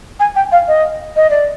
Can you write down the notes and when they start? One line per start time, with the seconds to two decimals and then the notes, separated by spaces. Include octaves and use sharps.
0.20 G#5
0.36 G5
0.52 F5
0.68 D#5
1.16 D#5
1.30 D5